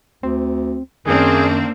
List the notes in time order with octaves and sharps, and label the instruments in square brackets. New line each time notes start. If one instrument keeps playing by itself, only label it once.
[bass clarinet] D2 [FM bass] C4
[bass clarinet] F#2 [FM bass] D#3 [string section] A#3 C4 D4 [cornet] G#4